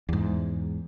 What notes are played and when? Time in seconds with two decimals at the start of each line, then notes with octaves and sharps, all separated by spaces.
0.09 E2 G#2